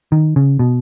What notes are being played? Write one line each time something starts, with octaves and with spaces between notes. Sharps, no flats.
D#3
C#3
B2